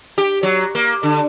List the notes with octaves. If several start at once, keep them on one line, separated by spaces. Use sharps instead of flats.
G4
F#3
A#3
D3